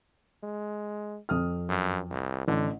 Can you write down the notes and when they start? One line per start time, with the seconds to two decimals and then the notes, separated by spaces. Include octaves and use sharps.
0.43 G#3
1.29 F2 D#6 F6
1.69 F#2
2.11 C2
2.48 A1 D3